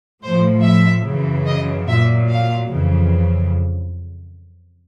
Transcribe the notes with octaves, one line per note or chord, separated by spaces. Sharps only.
A2 F3 C5
E5
F#2 C#3 E3
D#5
A#2 F#3 E5
F5
F2 C#3 E3